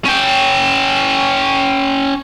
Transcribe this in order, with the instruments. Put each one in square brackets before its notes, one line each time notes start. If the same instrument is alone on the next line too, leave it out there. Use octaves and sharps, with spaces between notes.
[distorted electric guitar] C#4 G5